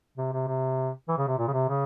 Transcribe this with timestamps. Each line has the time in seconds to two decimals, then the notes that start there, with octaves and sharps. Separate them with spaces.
0.18 C3
0.33 C3
0.48 C3
1.08 E3
1.18 C#3
1.28 C3
1.38 A#2
1.47 C#3
1.53 C3
1.69 C#3